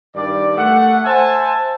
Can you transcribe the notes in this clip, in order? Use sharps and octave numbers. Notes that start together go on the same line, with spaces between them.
G2 D#3 D5
A3 F#5
C5 E5 G#5 A5